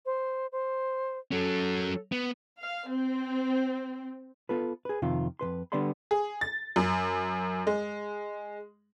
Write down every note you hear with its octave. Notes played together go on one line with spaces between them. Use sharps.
C5
C5
F#3 C#4 A4
B3
F5
C4
B3 F4 A4 B4
G#4 B4
F2 C3 D#3 F4
F2 B2 B4 C6
D3 G3 B3 D5 B5 C6
G#4
A6
F#2
G#3